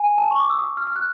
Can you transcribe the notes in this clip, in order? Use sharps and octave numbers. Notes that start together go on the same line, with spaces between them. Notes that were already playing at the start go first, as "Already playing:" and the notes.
Already playing: G#5
A5
C#6
D6
E6
D#6
F6
F6
F#6